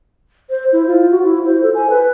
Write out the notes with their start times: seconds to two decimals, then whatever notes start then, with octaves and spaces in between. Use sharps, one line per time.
0.50 C5
0.73 E4
0.87 F4
1.11 F#4
1.23 E4
1.45 C5
1.63 A4
1.74 G#5
1.90 B4